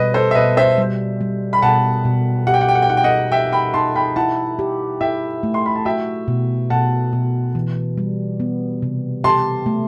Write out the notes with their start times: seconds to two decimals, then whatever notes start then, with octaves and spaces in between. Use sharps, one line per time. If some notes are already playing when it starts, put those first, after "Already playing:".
Already playing: B2 G3 B4 D#5
0.14 A4 C5
0.31 E5
0.35 B2 B4 D#5
0.57 C5 E5
0.78 G3
1.21 G3
1.53 B5
1.62 B2 F#5 A5
2.05 B2
2.47 G4 F#5
2.54 G5
2.61 F#5
2.69 G5
2.75 F#5
2.82 G5
2.90 D#4 F#5
2.97 G5
3.04 D#5 F#5
3.32 G4 E5 G5
3.52 G5 B5
3.74 D#4 A5 C6
3.96 G5 B5
4.16 E4 F#5 A5
4.59 G4
5.01 E4 E5 G5
5.43 A3
5.54 C6
5.66 B5
5.75 A5
5.85 F#4 E5 G5
6.28 B2
6.70 B2 F#5 A5
7.13 B2
7.55 E3
7.98 G3
8.40 B3
8.82 C3
9.24 G4 A5 C6
9.66 A3